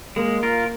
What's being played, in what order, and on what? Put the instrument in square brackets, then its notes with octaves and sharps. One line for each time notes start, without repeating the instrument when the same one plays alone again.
[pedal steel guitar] G#3 [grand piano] A#3
[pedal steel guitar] F4 A#4